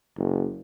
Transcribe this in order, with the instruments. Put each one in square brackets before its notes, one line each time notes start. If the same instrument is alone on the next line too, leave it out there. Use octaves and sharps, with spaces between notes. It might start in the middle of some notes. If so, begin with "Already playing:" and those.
[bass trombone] F#1